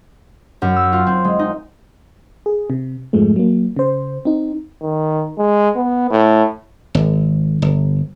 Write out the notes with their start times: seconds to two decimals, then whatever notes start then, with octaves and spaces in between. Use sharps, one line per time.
0.62 F#2
0.76 E6
0.93 F4
1.07 C4
1.24 G#3
1.39 D#4
2.46 G#4
2.70 C3
3.13 F2 G#2 F3 G#3 A3
3.36 F#3 A#3
3.76 C#3 C5
4.25 C4 D#4
4.82 D#3
5.38 G#3
5.76 B3
6.11 A2
6.95 G#1
7.62 G1